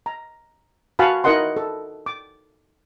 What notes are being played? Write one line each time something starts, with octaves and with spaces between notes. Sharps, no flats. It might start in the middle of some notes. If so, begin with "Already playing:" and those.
A#5
F#4 F5 F#5 G#5 A5 B5
D#4 E4 A#4 D#5 F#5 C6
A4
D6